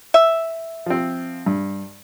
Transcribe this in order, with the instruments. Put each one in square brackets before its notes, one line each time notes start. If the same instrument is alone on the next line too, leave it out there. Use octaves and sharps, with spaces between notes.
[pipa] E5
[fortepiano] F3 C4
G2